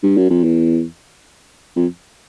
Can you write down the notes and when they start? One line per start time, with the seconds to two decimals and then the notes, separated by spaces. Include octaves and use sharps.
0.03 G2
0.17 F#2
0.30 F2
0.44 E2
1.76 F2